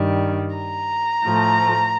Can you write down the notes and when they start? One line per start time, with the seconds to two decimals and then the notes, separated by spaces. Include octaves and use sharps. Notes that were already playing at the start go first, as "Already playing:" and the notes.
Already playing: G2 D#3 G3
0.55 A#5
1.23 A2 F3 A3